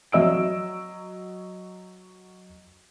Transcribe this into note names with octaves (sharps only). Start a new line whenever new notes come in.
F#3 D#5 E6 D7